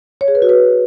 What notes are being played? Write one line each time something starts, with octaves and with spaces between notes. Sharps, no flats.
C#5
G#4
B4
F#4
B4